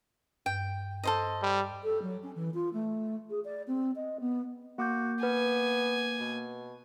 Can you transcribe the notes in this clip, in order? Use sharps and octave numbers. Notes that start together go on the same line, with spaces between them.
G2 G5
A4 C5 D#5
G3
A4
F#3
C#4
E3
F4
A3
G#4
D5
C4
D#5
B3
A#3 F#4 D6 G6
B3 B4 G#5
B2